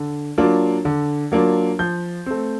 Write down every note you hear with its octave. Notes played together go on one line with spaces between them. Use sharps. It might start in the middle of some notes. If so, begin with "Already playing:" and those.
Already playing: D3
F#3 A#3 D4 F4
D3
F#3 A#3 D4 F4
F3 G6
A3 C4